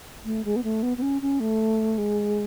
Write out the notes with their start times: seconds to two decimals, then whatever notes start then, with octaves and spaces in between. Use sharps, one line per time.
0.25 A3
0.45 G#3
0.56 B3
0.64 A3
0.83 B3
0.97 B3
1.02 C#4
1.22 C#4
1.40 A3
1.98 G#3